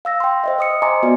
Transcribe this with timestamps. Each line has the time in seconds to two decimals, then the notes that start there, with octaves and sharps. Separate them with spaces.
0.05 F5 E6 A#6
0.20 G5 C6
0.44 C5 D#5 E5
0.58 C5 D#6 C#7
0.82 D#5 E5 G#5 A#5 C6 D6
1.03 B3 F#4 D5